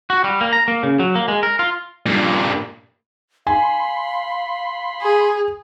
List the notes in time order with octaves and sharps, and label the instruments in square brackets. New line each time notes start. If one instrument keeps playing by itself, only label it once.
[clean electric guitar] F#4
G3
A#3
A#5
A#3
C#3
F#3
A#3
G#3
A#4
F4
[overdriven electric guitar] G2 A#2
[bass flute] F5 [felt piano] G#5 [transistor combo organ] B5 C6
[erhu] G#4